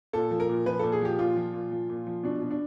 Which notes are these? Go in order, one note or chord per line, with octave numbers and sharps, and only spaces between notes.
A#2 A4
F3
A#4
A#2
F3 B4
A#2 A4
G#4
F3 G4
A#2 F4
F3
A#2
F3
A#2
F3
B2 D4
B2
D4